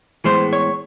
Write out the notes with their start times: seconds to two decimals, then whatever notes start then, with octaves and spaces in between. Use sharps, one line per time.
0.24 A2 E3 G#3 B3 C5
0.53 C#5